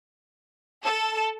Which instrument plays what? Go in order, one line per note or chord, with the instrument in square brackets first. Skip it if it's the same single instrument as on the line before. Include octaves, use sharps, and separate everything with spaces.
[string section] A4